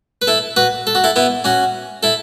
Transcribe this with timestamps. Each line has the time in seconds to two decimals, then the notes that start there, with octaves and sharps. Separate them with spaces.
0.22 B4
0.27 E4 A4
0.57 F#4 B4
0.87 A4
0.95 F#4
1.04 E4 A4
1.16 B3 E4
1.44 C#4 F#4
2.03 E4 A4